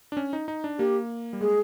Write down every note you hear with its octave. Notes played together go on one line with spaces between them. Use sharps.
D4
C#4
D#4
D#4
D4
A#3 G4
G3
G#3 G#4